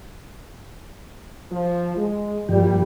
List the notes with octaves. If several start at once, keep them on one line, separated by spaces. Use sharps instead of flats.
F3
G#3
D2 G2 A#2 F3 G3 G4